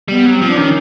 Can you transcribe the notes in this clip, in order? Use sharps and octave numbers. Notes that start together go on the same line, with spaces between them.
G3 B3
F#3
C4
F3
D4
D#3 C#4